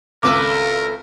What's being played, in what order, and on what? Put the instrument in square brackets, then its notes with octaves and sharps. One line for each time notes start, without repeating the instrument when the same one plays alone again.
[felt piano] G#1 C#2 E6 [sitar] A3 B4 [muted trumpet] A#4 [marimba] D6